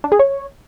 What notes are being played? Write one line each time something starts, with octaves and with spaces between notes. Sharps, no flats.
D4
G#4
C#5